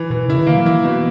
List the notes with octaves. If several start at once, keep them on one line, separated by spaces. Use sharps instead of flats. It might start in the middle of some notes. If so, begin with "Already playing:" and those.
Already playing: E3
B2 E3
C#3 E4
D#3
A#3
F#3
E3 E4
B2